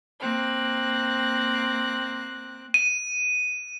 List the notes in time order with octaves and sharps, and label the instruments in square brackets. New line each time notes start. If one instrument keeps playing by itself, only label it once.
[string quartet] A#3 C4 F#6
[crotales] D#7